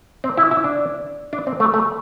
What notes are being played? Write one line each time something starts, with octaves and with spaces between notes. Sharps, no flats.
C4
E4
E4
D4
D4
C4
A3
A3